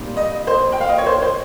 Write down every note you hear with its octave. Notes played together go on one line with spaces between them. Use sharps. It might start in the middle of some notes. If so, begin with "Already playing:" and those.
Already playing: A#2 G3 C4 D#4
D#5
C5
G5
F5
D#5
C#5
C5
C5